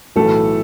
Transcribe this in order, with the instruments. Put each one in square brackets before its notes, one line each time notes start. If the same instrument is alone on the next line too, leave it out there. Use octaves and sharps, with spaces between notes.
[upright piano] B1 A2 E3 A3 A4